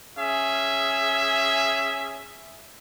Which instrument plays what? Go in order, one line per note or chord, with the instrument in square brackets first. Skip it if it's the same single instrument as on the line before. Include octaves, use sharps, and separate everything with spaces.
[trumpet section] C#4 G#4 E5